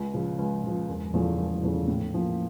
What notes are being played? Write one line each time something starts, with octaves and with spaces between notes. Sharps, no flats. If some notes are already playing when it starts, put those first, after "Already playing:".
Already playing: C#2
C#3 F3
C#2
C#3 F3
E1
E2 C#3 F3 A3
E1
E2 C#3 F3 A3
A2
F3 A#3